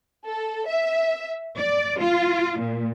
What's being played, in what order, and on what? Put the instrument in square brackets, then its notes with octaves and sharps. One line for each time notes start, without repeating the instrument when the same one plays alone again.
[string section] A4
E5
D5
F4
A#2